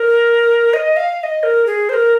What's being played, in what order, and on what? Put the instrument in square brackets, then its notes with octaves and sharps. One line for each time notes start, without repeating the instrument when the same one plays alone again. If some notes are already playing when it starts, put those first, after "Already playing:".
Already playing: [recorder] A#4
D#5
F5
F5
D#5
A#4
G#4
C5
A#4